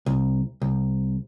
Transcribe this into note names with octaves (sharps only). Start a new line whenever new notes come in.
C2
C2